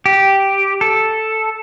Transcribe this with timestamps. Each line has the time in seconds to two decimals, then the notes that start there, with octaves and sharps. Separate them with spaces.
0.06 G4
0.81 A4